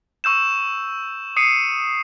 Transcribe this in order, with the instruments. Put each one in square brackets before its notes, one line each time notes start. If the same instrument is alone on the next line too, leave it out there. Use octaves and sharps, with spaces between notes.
[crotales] C#6 E6 G6 E7
D#6 C7 C#7 D#7